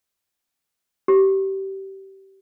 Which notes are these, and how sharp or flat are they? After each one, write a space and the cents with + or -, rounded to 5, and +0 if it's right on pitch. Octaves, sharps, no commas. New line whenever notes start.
G4 -25